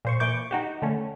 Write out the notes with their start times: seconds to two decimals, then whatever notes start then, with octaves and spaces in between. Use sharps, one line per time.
0.05 A#2 C5 C#6
0.20 A#2 E3 C#6 D6 G6
0.51 D#4 F#4 G4
0.82 D3 A3 C#4